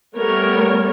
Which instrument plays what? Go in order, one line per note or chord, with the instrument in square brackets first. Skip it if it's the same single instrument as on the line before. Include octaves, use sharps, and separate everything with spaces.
[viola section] G3 A3 B3 A#4 C#5